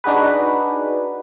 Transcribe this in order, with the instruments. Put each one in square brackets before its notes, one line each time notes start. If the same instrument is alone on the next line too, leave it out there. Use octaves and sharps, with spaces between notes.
[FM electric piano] D4 D#4 F#4 G#4 B4